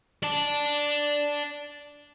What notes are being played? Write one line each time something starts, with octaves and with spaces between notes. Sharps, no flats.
D5 A5